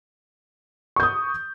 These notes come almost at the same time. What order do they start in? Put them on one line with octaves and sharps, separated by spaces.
C#6 G6 D#6